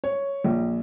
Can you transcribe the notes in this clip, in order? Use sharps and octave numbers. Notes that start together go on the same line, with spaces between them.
C#5
A#1